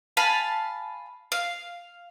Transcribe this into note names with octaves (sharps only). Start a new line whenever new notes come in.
F5 G#5 A5 B5
F5